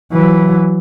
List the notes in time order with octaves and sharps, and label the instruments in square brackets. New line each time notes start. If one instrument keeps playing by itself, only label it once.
[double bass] E3 F#3